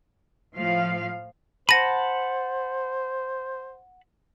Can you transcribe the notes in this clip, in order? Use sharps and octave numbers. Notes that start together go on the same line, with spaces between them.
A2 F3 F5
C5 F#5 A5 B5 A#6 D#7